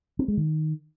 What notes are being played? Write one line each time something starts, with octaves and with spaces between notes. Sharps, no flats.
C4
G#3
D#3